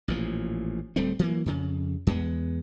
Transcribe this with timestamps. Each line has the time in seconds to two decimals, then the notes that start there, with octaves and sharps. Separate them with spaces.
0.08 A1 A#2 F3
0.96 D1 G3 A3 C4
1.19 E3 F#3 A#3
1.46 F2 C#3
2.07 E2 G#3 B3